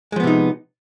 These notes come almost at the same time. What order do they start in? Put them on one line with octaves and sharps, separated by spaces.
G#3 F3 B3 C3 D#4